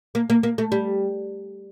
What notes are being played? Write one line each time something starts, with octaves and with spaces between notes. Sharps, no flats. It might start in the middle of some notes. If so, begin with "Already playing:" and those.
A#3
A#3
A#3
A3
G3